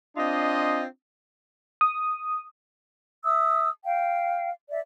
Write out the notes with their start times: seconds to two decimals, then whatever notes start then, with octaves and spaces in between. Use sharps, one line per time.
0.17 C4 D4 F4 D#5
1.81 D#6
3.24 E5 D#6 E6
3.85 F5 G5
4.71 D5 E5